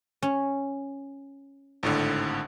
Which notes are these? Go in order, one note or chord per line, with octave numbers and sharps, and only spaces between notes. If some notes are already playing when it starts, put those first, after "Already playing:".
C#4
G#1 A2 D3